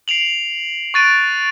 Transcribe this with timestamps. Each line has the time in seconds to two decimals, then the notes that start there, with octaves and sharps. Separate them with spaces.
0.08 C7 D7 F7 F#7
0.94 C#6 F#6 A6 D7 D#7